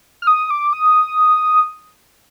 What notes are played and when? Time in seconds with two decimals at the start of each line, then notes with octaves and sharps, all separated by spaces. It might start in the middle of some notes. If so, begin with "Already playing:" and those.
0.22 F6
0.27 D#6
0.50 D6
0.73 D#6